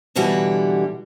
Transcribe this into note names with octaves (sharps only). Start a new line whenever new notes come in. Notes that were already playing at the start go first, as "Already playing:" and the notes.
B2 D3 E3 G3 F#4